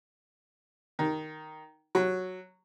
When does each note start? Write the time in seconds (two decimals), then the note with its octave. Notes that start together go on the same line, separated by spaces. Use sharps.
0.99 D#3
1.95 F#3